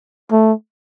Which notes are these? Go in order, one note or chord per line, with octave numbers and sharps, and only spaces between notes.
A3